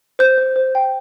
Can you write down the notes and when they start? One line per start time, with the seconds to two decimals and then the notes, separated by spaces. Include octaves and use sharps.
0.19 C5 G6
0.38 C5
0.56 C5
0.75 G5